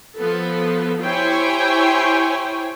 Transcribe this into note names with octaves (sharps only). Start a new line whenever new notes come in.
F3 B3 A4
E4 G4 C5 C#5 G5 G#5